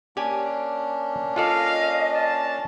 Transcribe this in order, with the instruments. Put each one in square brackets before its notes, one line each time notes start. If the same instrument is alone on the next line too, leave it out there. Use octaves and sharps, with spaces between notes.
[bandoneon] A#3 C#4 D4 [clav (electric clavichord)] G4 D5 G#5
[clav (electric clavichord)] F4 A4 D5 [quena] D#5 [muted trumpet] F5
[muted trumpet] A5